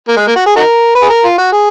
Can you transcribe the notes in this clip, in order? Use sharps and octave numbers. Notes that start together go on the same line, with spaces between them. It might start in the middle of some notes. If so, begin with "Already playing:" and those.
A#3
G#3
A#3
F#4
G#4
D#4 F#4 A#4
B4
G#4
A#4
F4
F#4
G#4